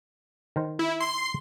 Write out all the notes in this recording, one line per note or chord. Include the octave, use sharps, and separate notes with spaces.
D#3 A#4 C5
E4
C6 C7